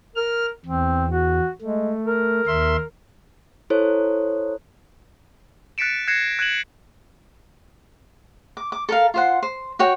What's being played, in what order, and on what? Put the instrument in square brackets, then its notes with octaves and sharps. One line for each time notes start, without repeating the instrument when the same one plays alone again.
[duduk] A#4 [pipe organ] F6
[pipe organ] E2 [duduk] C4
[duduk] F#4
[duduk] G#3 [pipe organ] A3
[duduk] A#4
[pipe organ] D#2 E5 C6
[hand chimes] E4 A4 C5 C#5
[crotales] F#6 A6 B6 C#7 D7 E7
F#6 G#6 A#6 C7 C#7 E7
F#6 G#6 D#7 E7 F#7
[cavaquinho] D6
D6
A4 A#4 F5
F4 C5 F#5
C5
F#4 C#5 G5